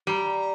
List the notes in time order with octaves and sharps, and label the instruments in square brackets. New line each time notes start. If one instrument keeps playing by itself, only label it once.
[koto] G3 [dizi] A#5